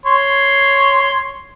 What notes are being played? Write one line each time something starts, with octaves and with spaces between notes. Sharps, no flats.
C#5 C6